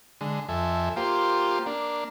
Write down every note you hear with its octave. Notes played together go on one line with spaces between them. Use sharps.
D3 G#3
F2 A4 E5 G#5
A#3 F4 G4 C5
A#3 D4